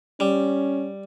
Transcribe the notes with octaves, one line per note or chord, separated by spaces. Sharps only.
G3 C#4